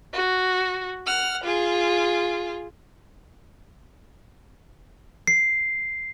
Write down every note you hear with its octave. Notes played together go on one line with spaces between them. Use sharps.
F#4
F#5 F6
F4 G#4
C7